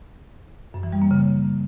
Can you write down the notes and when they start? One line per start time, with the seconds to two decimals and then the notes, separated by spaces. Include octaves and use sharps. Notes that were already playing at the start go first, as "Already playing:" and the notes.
0.74 F#2
0.83 E3
0.92 G3
1.02 A#3
1.11 C#3